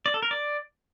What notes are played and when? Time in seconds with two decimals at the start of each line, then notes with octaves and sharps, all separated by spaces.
0.06 D5
0.14 A4
0.22 A#4
0.31 D5